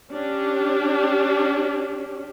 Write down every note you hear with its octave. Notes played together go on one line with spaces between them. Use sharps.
C#4 D4 G4